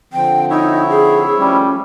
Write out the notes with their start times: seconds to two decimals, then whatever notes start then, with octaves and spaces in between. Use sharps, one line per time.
0.13 D3 F3 C4 G5
0.50 D#4 E4 C#5 E5
0.90 G#4
1.39 F3 G3 A3 C#4